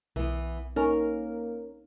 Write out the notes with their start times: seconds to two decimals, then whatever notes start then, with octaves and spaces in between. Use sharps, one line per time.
0.16 B1 E3 B3
0.76 A#3 C#4 D#4 A#4 F6